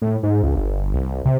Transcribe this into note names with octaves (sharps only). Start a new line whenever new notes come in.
A2
G#2
C#2
G1
C2
C3